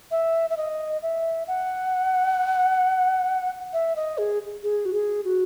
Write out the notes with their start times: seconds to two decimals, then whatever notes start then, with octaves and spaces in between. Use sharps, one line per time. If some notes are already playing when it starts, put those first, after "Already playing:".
0.11 E5
0.50 E5
0.57 D#5
1.03 E5
1.48 F#5
3.73 E5
3.96 D#5
4.18 G#4
4.63 G#4
4.85 F#4
4.93 G#4
5.25 F#4